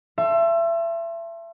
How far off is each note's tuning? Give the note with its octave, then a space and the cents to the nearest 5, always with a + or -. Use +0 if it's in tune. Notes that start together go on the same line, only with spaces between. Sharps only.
E5 +30 A5 +0 C6 +25